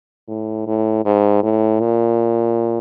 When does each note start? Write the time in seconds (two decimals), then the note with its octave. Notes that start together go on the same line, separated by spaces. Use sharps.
0.28 A2
0.67 A2
1.05 G#2
1.43 A2
1.80 A#2